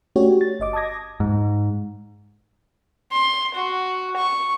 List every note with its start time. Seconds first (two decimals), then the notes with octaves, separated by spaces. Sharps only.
0.16 A3 C#4 D4 F#4 G4 C#5
0.41 A6
0.60 G1 D#5 D6
0.73 A5 D6 D#6 G#6 A#6
1.20 G#2
3.13 C6
3.55 F#4
4.17 C#6